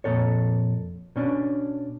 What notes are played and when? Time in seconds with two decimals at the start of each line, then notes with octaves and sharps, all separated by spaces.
0.04 F2 A#2 A4 C#5
1.16 B2 C#4 D4